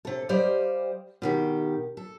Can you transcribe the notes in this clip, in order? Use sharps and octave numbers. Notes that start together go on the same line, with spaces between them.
C3 A4
G3 G4 C5 D5 D#5 F5
B2 D#3 G4
A4